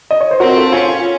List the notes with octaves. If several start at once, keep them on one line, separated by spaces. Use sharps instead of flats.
D#5
C#5
C5
C4 F#4 A#4
F4 A4
C#4 F4
F4